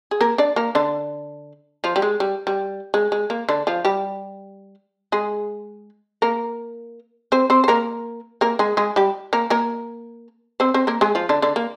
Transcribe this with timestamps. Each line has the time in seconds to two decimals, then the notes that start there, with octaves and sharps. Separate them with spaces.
0.11 G#4
0.21 A#3 A#4
0.38 D4 D5
0.56 A#3 A#4
0.75 D3 D4
1.84 F3 F4
1.96 G3
2.02 G#3
2.20 G3
2.47 G3
2.94 G#3
3.12 G#3
3.30 A#3
3.49 D3 D4
3.67 F3 F4
3.85 G3 G4
5.12 G#3 G#4
6.22 A#3 A#4
7.32 C4 C5
7.50 C4 C5
7.64 C5
7.68 A#3 A#4
8.41 A#3 A#4
8.59 G#3 G#4
8.77 G#3 G#4
8.96 G3 G4
9.33 A#3 A#4
9.50 A#3 A#4
10.60 C4 C5
10.74 C4 C5
10.87 A#3 A#4
11.01 G#3 G#4
11.15 F3 F4
11.29 D3 D4
11.42 D3 D4
11.56 A#3